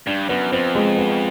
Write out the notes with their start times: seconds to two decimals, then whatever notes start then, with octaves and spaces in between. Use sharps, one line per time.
0.07 G2 D4
0.29 F#2 B3
0.52 F2 C4
0.75 G#3
0.97 B3